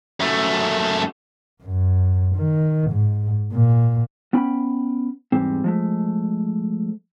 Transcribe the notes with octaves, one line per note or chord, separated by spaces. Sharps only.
F#2 A3
F#2
D#3
G#2
A#2
B3 C#4 G5 B5
E2 G#2 G3 C4
F3 G#3 A3